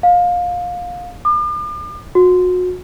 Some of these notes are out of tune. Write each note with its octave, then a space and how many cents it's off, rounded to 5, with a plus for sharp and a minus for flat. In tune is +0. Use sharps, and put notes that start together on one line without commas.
F5 +25
D6 +45
F#4 -30